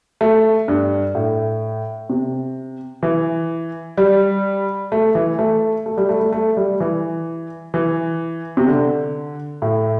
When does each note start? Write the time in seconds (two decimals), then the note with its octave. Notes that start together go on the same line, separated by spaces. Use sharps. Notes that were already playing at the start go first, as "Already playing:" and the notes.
0.21 A3
0.68 G2
1.15 A2
2.10 C3
3.03 E3
3.97 G3
4.92 A3
5.15 E3
5.39 A3
5.86 A3
5.97 G3
6.09 A3
6.20 A3
6.32 A3
6.57 G3
6.80 E3
7.74 E3
8.57 C3
8.68 D3
9.62 A2